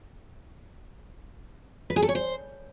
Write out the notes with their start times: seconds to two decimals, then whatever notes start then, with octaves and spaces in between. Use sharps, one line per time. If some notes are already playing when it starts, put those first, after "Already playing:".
1.90 B4
1.96 G#4
2.02 A4
2.09 C#5
2.15 C5